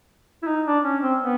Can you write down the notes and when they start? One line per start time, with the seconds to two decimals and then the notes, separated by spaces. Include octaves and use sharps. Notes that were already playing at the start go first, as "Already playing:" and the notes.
0.43 E4
0.47 D#4
0.66 D4
0.84 C#4
1.02 C4
1.20 B3